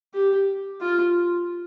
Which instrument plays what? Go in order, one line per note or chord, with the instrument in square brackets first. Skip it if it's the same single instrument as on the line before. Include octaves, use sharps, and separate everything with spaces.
[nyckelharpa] G4
F4